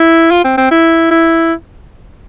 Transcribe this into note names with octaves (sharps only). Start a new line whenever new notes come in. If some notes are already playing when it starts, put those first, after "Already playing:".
Already playing: E4
F4
C4
C4
E4
E4